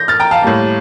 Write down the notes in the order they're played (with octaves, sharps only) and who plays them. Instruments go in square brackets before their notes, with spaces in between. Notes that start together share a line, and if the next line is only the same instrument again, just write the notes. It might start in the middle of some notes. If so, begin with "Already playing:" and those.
Already playing: [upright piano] G6 A#6
F6 A6
G5 A#5
F5 A5
A2 G3 A#3